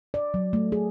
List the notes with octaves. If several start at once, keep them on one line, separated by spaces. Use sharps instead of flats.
D5
F#3
A3
G#4